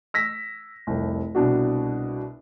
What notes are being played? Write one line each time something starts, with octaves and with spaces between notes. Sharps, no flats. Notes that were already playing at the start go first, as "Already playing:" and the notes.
E6 A#6 B6
F1 C2
C2 B2 D4 F#4